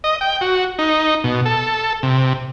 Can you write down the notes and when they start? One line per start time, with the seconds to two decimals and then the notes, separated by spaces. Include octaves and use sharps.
0.04 D#5
0.21 G5
0.41 F#4
0.79 D#4
1.24 B2
1.46 A4
2.03 C3